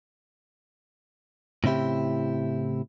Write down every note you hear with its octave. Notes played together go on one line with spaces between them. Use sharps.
A2 C#3 C4 E4 G4